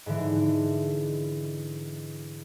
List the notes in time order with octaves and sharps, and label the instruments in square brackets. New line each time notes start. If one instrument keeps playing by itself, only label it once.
[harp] G#2 D3 E3